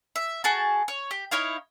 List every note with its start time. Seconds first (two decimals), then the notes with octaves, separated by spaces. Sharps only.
0.16 E5
0.44 F#4 G#4 A5
0.88 C#5
1.11 G4
1.31 D#4 E4 C#5 F5